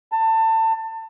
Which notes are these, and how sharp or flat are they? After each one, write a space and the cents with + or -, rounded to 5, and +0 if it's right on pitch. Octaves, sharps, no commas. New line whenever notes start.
A5 +25